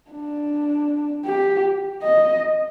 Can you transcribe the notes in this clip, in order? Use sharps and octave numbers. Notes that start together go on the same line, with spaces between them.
D4
G4
D#5